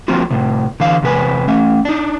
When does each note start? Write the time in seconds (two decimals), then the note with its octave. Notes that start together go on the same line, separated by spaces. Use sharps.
0.08 F3 A#3 C4 F4 F#4
0.30 A2 C3
0.80 D3 E3 F5
1.02 E2 C3 B4 G#5
1.47 A3 C#4 E5
1.85 D4 D#4